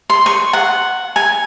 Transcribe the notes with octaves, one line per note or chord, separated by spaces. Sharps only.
C6
C#6
F#5
G#5